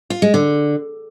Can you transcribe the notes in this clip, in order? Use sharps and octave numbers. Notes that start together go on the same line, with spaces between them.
F4
G#3
D3